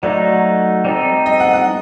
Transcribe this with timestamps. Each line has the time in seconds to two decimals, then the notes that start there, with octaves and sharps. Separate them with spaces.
0.03 F#3 A3 D#4 D5
0.85 G3 C4 D#4 A4
1.26 D#5
1.40 F#5
1.53 F#5